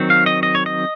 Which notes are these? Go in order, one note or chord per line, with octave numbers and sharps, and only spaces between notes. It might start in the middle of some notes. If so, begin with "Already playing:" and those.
Already playing: D#3 F#3 C4
F5
D#5
D#5
C#5
D#5